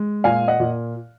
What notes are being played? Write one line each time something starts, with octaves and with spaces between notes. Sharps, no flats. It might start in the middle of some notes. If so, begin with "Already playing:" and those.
Already playing: G#3
A#2 F5 G#5
D#5 F#5
A#2